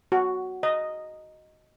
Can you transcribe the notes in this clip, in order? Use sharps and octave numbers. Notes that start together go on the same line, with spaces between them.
F#4
D#5